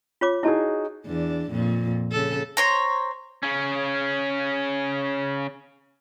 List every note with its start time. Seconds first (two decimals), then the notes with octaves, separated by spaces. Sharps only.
0.21 F4 C#5 D6
0.43 D#4 E4 F#4 G#4 A5
1.06 E2 D4
1.51 F2 A#2
2.12 C#3 A4
2.57 C5 C#5 A#5
3.43 C#3 C#4